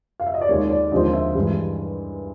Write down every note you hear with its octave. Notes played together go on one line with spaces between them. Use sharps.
F5
E5
D#5
D5
D#2 D#3 G#3 C#5
D5
D#2 D3 F3 G#3 C4 D#5
E5
G2 E3 G#3